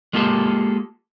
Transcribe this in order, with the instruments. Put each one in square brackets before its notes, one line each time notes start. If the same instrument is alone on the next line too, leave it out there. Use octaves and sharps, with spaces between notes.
[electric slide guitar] G#3 A#3 F4 G4 A4